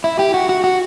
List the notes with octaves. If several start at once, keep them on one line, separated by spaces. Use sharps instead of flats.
E4
G4
F#4
F#4
F#4